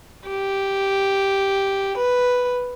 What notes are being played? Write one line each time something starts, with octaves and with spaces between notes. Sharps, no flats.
G4
B4